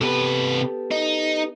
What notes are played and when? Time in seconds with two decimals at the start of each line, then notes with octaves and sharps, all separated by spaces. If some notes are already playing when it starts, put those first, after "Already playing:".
0.01 C3 B3 G4 A4 B4
0.91 D#4